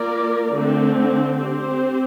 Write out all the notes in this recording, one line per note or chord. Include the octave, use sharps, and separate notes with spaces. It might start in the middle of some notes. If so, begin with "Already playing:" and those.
Already playing: A#3 F4 A#4 D5
D3 A3 C4
C4 G4 C5